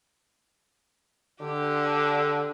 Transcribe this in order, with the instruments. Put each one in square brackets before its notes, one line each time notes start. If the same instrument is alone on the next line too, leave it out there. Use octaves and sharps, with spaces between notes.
[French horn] D3 [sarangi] G4